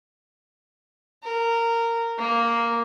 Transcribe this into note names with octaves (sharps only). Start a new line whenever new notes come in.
A#4
A#3